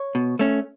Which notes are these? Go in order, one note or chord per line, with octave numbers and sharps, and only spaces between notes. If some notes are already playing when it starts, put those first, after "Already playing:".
Already playing: C#5
B2
A3 C#4